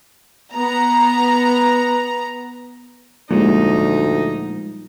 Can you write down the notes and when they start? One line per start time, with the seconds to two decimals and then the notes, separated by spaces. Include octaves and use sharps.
0.53 B3 A#5
3.31 D2 A#2 F3 G3 G#3 D#4